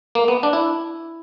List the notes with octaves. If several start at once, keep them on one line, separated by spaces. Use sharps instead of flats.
A#3
B3
D4
E4